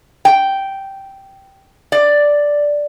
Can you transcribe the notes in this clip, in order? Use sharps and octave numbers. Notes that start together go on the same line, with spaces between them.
G5
D5